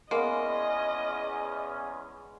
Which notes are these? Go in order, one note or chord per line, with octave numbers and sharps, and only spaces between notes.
E2 G#3 A#3 B3 C#4 D#5